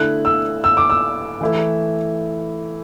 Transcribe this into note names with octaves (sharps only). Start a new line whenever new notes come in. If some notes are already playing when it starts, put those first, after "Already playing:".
Already playing: D3 A3 E4 F#6
E6
E6
D6
E6
E3 A3 E4